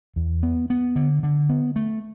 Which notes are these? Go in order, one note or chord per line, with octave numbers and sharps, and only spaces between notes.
E2
B3
B3
D3
D3
B3
A3